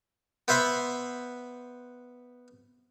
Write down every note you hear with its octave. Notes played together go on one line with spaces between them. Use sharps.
B3 C5 E5 F#5 B5